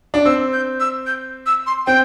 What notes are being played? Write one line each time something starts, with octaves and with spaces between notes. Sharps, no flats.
D4
C4 E6
G6
E6
G6
E6
C6
C4 G5